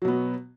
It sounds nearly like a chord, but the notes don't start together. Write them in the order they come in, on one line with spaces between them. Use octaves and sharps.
F#3 B2 B3